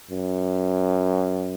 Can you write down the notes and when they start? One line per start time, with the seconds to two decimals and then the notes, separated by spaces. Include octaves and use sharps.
0.11 F#2